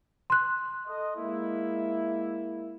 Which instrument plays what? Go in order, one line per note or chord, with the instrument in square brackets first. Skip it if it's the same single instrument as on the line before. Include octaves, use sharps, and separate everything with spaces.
[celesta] C6 F#6
[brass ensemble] A4 D#5
G#3 A#3 E4